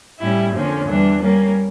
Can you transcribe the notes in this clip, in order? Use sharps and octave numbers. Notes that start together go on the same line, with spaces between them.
A2 G3 C#4 E4
F2 D3 F3 A#3 C#4
E2 E3 G3 D4
G3 A#3 C#4